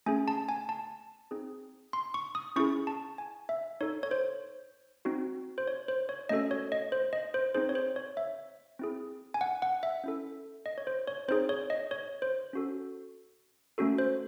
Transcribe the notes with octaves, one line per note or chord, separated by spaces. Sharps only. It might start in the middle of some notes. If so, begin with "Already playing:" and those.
A3 C#4 G#4 G#5
A5
G#5
A5
C4 D#4 G#4
C6
C#6
D#6
C#4 E4 G#4 C#6
A5
G#5
E5
D#4 A4 C#5
C#5
C5
C4 D#4 F#4
C5
C#5
C5
C#5
A3 C#4 F#4 A4 D#5
C#5
D#5
C5
D#5
C5
C4 D#4 G#4 C5
C#5
C5
C#5
E5
C4 E4 G#4
G#5
F#5
F#5
E5
C#4 E4 A4
D#5
C#5
C5
C#5
C4 D#4 G#4 C5
C#5
D#5
C#5
C5
C#4 F#4 A4
A3 C#4 F#4 A4
C5